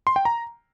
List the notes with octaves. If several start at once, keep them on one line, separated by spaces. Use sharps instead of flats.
C6
G5
A#5